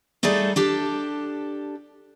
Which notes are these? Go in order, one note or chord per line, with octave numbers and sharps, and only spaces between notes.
G3 A3 D#4 G#4 A4 D5
D4 G4 A4